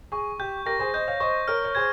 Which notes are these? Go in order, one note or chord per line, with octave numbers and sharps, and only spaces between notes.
G#4 C#6
G4 G6
G4 A#4 A#6
G#4 C5
C5 D#5 G6
C#5 F5
C5 D#5 C#6
A#4 C#5 F6
C#5
G#4 C5 G#6